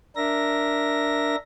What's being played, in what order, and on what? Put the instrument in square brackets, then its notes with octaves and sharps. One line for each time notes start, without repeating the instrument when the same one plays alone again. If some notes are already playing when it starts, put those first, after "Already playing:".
[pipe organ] D4 A#4 E5 A#6